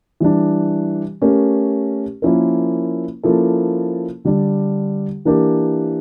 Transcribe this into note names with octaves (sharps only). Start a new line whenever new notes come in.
E3 G3 D4
A3 C#4 G4 A#4
F3 A#3 C#4 E4 A#4
F3 A#3 C#4 E4 A4
D3 G3 D4
E3 A#3 D4 G4 A#4